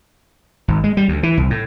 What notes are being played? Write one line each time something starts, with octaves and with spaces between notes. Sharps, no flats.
G#1
G#3
G3
D2
E3
C2
A2